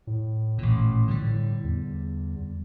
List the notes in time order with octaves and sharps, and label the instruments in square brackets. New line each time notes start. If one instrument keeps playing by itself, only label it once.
[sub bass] A2
[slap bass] A1 A#2
D3 G3
[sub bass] A2
E2